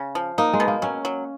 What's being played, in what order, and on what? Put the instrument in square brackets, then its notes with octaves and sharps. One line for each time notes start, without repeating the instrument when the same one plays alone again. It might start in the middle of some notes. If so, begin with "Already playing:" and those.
Already playing: [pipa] C#3
F3
[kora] A#3 [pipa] D#4
[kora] G#3
[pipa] B2
[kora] A#3
[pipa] F#3 [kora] C#4
[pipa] F#3